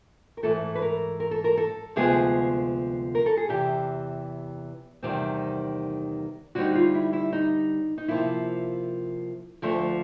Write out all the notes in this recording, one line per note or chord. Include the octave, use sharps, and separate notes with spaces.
A#4
G#2 E3 A3 A4
B4
A#4
A#4
A4
A#4
A4
D2 C3 F3 G#3 B3 G#4
A#4
A4
G#4
E2 C3 E3 G4
E2 C3 D#3 G3 C4
D3 G3 C4 D#4 F#4
F4
E4
E4
D#4
D#4
C3 F3 A#3 E4
D2 D3 F3 A3